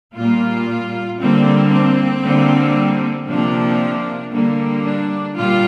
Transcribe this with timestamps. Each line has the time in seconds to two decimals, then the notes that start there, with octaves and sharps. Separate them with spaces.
0.15 A#2 G3 A#3 F4
1.19 D3 G3 A#3 C4
1.72 C4
2.23 D3 G3 A#3
3.28 C3 F3 A#3 D4
4.32 D3 G3 A#3
4.84 D4
5.36 A#2 G3 F4